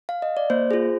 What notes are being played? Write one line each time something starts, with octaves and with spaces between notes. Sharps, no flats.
F5
D#5
D5
A#3 C5
F4 G#4